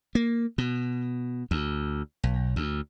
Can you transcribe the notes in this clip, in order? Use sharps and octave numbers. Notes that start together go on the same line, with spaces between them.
A#3
B2
D2
B1
D2